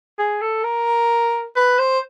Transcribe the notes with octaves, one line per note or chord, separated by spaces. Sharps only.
G#4
A4
A#4
B4
C5